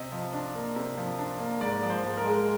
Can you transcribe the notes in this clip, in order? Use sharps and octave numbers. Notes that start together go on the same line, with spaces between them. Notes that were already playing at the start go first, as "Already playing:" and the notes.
Already playing: C3 D#5
F3
D4
A#3
C3
F3
D4
A#3
G#2 D5
F3
C5
G#2
A#4
G#3